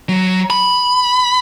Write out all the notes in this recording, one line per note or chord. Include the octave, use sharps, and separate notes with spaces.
F#3
B5